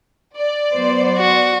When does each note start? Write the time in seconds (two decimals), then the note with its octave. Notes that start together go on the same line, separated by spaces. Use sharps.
0.37 D5
0.72 F#3 B3 C5
1.18 F#4